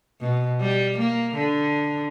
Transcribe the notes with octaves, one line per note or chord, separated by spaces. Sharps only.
B2
G3
A#3
D3